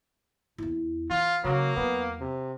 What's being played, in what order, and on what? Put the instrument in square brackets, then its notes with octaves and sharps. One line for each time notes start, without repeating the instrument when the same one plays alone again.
[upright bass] E2 E4
[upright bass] E3 [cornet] F4
[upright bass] C#3 [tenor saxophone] F#3 [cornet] A#3
[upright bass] E2 F#3 [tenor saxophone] B3
[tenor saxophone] C3